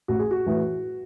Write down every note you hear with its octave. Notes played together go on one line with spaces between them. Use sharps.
A1 F#4
G#4
F#4
A2 E3